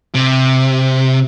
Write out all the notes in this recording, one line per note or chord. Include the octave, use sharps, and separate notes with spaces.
C3